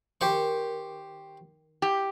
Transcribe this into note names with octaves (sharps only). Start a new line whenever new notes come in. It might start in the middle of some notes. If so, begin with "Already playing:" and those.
D#3 G4 C5 C#6
E4 G4